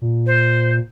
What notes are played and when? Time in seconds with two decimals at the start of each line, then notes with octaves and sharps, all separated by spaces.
0.02 A#2
0.27 C5